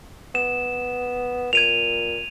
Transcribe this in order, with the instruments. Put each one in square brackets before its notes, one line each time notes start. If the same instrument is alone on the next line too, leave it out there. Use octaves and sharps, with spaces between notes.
[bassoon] B3 [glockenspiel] E7
[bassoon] A#2 [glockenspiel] G#6 D#7 F7